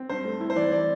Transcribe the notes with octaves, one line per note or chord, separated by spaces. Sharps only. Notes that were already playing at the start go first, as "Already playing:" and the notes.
Already playing: C4
G2 C5
A3
E4
C5
E3 D5
D5